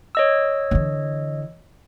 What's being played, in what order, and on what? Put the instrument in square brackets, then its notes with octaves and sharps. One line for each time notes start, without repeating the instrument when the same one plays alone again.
[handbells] C#5 D#5 E6
[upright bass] D3 E3